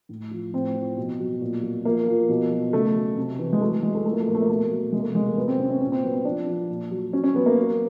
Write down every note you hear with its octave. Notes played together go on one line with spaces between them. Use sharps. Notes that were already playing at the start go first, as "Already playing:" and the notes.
A2
F3
A2 C4
F3
B2
F#3
A#2
F#3
F3 A#3
F3
B2
F#3
C#3 A3
F#3
C3
E3
G#3
F#3 A3
F#3 G#3
A3
F3 A3
A#3
A3
A#2 A#3
A3
A#3
B2 A3
A#3
A3
F#3
C3 G#3
A#3
A3
C3 G#3
A3
F#3 B3
C4
C3 C#4
C#4
A#2 C#4
C4
F#3 B3
C4
F3 D4
F3
A#2
F#3
F#3 C#4
C#4
F#3 B3
A#3
F#3